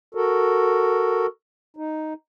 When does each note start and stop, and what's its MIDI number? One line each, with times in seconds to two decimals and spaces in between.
0.15 1.26 66
0.15 1.26 69
0.15 1.26 70
1.77 2.13 63